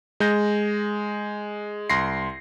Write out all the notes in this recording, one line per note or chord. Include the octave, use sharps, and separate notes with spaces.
G#3 G6 A#6
C2 C6 A#6 C7